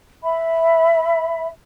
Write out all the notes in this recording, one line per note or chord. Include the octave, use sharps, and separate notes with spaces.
E5 B5